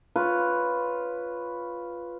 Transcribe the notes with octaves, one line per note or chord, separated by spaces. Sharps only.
F4 B4 C#5